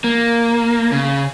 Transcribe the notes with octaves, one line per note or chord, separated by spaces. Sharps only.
A#3
C#3